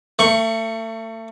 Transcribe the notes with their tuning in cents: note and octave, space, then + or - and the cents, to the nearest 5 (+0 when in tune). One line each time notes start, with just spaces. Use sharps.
A3 +35 C#6 +0